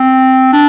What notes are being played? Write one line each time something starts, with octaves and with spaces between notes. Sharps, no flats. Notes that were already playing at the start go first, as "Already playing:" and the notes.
Already playing: C4
D4